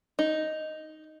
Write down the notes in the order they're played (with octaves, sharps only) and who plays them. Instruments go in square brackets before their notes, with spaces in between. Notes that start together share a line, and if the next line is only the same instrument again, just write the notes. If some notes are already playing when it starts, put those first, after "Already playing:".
[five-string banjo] D#4